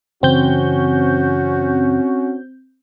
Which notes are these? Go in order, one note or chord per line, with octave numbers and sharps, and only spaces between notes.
F#2 C#3 E3 C4 C#4 F#4 G6